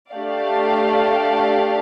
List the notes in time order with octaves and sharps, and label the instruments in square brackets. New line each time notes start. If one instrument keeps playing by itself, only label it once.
[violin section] A3 D4 G4 D5 F5